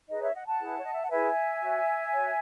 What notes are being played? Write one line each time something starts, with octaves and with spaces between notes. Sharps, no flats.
D#4 G#4 B4 D#5
C#5 E5
D#5 F#5
F#5 A5
E4 G#4 B4
C#5
D#5
E5
F#5
E4 G#4 B4 E5 G#5
F#4 C#5
F#4 C#5